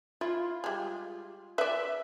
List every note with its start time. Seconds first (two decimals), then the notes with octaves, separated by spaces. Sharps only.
0.21 E4 F4
0.64 G3 G#3
1.58 B4 D5 E5